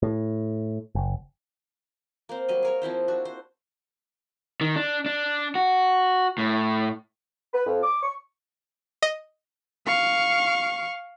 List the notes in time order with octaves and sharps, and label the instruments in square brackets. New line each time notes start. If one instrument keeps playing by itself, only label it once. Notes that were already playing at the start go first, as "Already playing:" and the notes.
[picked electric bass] A2
F#1
[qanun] A#3 C4 C5
F#3 G3 D#5
G#4 A#4 C#5
F3 C4 E4 C5
D4 F#4
C5
[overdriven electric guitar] D#3
D4
D4
F#4
A2
[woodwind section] B4
F2
D6
C#6
[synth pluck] D#5
[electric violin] F5 C#6